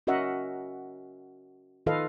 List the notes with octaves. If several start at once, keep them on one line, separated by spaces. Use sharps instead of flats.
C#4 F#4 A#4 D#5 E5 F#5
D#3 F4 A4 B4 D#5 F5